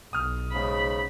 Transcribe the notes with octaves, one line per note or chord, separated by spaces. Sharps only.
B1 D#6 F6
G#2 C#3 B5